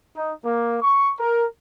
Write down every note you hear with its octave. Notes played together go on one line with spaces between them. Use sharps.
D#4
A#3
C#6
A#4